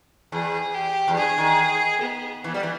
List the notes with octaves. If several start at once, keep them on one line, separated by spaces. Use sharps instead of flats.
E2 G#4
G4
E2
G2 G#4
D#3
B3
E3 B3
G3
E3